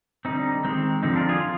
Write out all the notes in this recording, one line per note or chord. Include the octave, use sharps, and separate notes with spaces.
D3 G3 C4 D#4
D#3 G#3 C4
D3 F3 C4 D#4
D4 F4
F4 G#4
F3